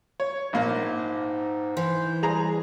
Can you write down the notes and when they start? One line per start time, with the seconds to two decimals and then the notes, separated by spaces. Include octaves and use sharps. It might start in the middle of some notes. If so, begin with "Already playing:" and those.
0.20 C#5
0.53 A#1 G#2 A#3
1.77 E3 C5
2.23 G3 G#4 A#5